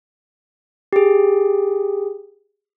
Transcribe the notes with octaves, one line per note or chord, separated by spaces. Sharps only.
G4 G#4